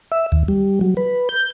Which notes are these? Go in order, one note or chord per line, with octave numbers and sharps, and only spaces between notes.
E5
D#2
G3
F#3
B4
G6